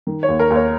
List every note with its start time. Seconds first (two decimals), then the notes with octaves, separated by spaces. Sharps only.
0.07 D#3
0.23 C#5
0.28 D#2
0.39 A#4
0.50 D#2
0.55 C#5